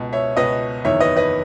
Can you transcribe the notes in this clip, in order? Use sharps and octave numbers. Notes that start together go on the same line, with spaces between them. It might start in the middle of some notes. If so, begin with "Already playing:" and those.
Already playing: C#2 B2
C#5 E5
C#2 B2 B4 D#5
F#1 E2 D#3 C#5 E5
B4 D#5
B4 D#5